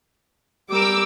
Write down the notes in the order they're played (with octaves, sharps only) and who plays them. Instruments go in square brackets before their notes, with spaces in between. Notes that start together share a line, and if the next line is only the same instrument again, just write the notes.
[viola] G3 A#4 [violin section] D6 E6